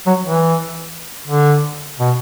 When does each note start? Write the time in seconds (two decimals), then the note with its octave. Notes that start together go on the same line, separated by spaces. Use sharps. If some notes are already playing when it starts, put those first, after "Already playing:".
0.07 F#3
0.26 E3
1.28 D3
2.00 B2